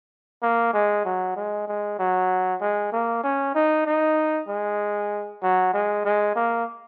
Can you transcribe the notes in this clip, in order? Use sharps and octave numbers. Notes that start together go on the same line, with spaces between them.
A#3
G#3
F#3
G#3
G#3
F#3
G#3
A#3
C#4
D#4
D#4
G#3
F#3
G#3
G#3
A#3